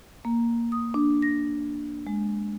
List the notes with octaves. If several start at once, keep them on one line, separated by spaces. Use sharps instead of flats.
A#3
D#6
D4
A#6
G#3